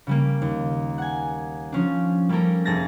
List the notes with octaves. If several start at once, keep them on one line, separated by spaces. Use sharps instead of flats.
C#3 G3 A#3
D#2
F#5 G#5
F3 C#4 D4
G3 A#3 C#4 A4 A#4
F1 G#4 A5 A6 A#6